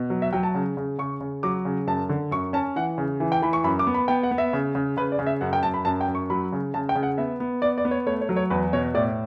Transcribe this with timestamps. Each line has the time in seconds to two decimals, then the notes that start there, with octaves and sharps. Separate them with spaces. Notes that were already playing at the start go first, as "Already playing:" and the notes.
Already playing: B2
0.10 F#3
0.22 E5
0.33 F#3 G5
0.43 A5
0.54 C#3
0.77 C#3
0.98 C#3 C#6
1.21 C#3
1.43 F#3 D6
1.65 C#3
1.87 F#2 A5
2.09 D3
2.31 F#2 C#6
2.53 C#4 A5
2.76 E3 F#5
2.98 C#3
3.20 E3
3.32 G5
3.42 E3 B5
3.53 C#6
3.64 F#2 B5
3.79 D6
3.87 B3
3.94 B5
4.08 B3 G5
4.23 F#5
4.31 B3
4.38 E5
4.53 C#3
4.75 C#3
4.97 C#3 B4
5.12 D5
5.19 C#3
5.26 E5
5.41 F#2 F#5
5.53 G5
5.63 F#2 A5
5.74 B5
5.85 F#2 A5
6.01 G5
6.08 F#2
6.15 C#6
6.30 F#3 B5
6.52 C#3
6.74 C#3 A5
6.89 G5
6.95 C#3
7.03 F#5
7.18 B3 E5
7.40 B3
7.62 B3 D5
7.78 D5
7.85 B3
7.91 C#5
8.07 A3 C#5
8.21 C#5
8.29 F#3
8.36 C#5
8.50 E2 B4
8.73 B2 C#5
8.94 A2 D5